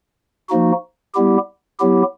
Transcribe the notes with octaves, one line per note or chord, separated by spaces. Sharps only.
F3 A#3 D#4 F#4
G3 B3 E4 G4
F#3 B3 E4 G4